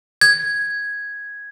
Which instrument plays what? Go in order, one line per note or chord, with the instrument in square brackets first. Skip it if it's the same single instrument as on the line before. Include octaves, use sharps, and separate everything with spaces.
[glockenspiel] G#6